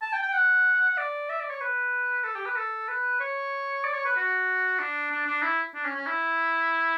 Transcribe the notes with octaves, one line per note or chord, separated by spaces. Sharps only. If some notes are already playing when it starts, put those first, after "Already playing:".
A5
G5
G5
F#5
D5
E5
D5
C#5
B4
A4
G4
B4
A4
B4
C#5
D5
C#5
B4
F#4
D4
D4
D4
E4
D4
C#4
C#4
E4